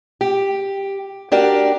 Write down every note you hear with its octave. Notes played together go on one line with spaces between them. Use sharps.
G4
D4 F#4 G4 A#4 D5